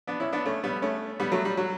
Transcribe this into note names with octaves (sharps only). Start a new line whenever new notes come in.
B3 D4
C#4 E4
B3 D4
A3 C#4
G3 B3
A3 C#4
G3 B3
F#3 A3
G3
F#3